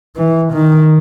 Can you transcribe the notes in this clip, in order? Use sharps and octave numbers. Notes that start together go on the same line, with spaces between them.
E3
D#3